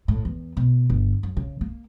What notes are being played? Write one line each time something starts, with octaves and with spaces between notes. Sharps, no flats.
A2
E2
B2
G1
F#2
C#3
A#3